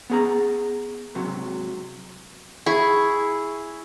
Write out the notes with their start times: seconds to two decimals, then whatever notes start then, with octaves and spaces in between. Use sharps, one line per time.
0.10 B3 G#4 A#5
1.15 G#2 C3 F#3
2.66 E4 G#4 C#6